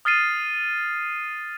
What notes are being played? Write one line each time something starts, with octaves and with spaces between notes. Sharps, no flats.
D#6 F6 A6 C7 D#7